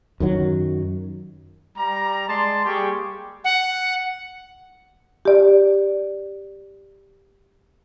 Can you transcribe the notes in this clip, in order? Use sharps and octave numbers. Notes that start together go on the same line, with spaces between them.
F#2 D#3 F#3
G3 A#5
G#3 D5 A5 C6
G3 A#3 G4 G#4 C#6
F#5
G4 D5